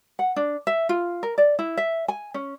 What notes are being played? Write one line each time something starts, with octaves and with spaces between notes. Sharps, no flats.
F#5
D4
E5
F4
A#4
D5
E4
E5
G#5
C#4